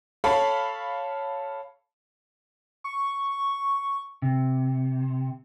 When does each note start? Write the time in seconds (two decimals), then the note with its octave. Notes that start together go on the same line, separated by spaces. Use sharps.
0.24 A4 C#5 F5 B5
2.84 C#6
4.22 C3